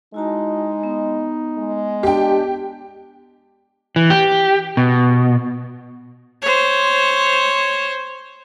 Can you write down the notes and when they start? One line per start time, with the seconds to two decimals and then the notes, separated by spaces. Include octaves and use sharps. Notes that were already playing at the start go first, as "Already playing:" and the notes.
0.14 G#3 D#4 E4 F#4 A5
0.83 B3
1.58 G#3
2.03 D4 G4 G5
3.96 E3
4.10 G4
4.77 B2
6.42 C5 C#5